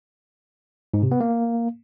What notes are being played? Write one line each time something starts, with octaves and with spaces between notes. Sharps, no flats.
G#2
C3
B3
A#3